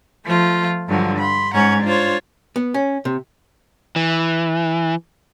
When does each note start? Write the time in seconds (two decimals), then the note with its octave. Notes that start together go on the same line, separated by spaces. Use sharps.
0.24 F3 A3 F4
0.88 G2 D3 F3 F#3
1.19 B5 C6
1.54 G#2 C#4 F#5 A#5 G#6
1.83 D4 F4 C5 C#5
2.56 B3
2.74 C#4
3.05 C3
3.96 E3